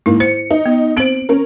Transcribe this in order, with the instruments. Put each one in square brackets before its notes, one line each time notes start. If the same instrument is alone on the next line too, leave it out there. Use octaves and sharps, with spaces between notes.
[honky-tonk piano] G#2 A#3 [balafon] E4
[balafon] C5 [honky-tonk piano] C#7
[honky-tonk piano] D#4
[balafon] B3
[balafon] C4 C5 [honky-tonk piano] D7 F#7
[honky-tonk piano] C#4 A#4